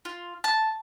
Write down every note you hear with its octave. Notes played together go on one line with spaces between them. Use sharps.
F4
A5